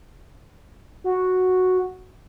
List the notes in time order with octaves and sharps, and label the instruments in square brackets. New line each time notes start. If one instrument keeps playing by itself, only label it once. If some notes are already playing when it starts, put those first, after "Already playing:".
[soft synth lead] F#4